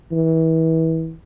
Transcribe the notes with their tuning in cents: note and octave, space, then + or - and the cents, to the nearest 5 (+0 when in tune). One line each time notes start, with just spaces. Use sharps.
E3 -30